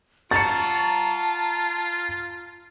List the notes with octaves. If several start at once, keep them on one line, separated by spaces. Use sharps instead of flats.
F4 F#5 A5 A#5 A6 C#7